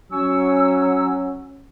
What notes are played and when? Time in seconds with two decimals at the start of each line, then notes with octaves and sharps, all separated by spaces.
0.12 F#3 C#4 G#5 C#6 E6